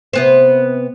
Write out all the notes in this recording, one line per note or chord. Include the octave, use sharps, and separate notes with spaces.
C3 B3 C5